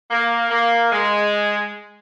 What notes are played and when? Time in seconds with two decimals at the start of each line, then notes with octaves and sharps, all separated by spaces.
0.11 A#3
0.51 A#3
0.93 G#3